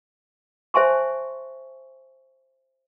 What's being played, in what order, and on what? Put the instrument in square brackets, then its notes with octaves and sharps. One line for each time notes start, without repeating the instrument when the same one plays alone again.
[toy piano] C5 E5 G#5 A5 C6 C#6